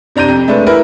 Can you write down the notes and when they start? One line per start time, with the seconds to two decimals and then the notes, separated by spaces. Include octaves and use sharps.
0.16 C3 D4 A#5 G6 D#7
0.28 F2
0.48 G#3 A3 D4 B4
0.66 E4 A#4 B4